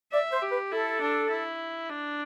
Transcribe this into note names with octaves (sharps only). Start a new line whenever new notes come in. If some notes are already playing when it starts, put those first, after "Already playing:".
D5 E5
C5
G4
B4
E4 A4
D4
E4
D4